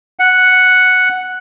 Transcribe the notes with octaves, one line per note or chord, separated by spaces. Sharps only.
F#5